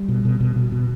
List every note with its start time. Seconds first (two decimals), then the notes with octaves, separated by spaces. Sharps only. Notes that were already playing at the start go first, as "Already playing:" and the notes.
Already playing: G3
0.08 B2
0.25 B2
0.40 B2
0.56 B2
0.72 B2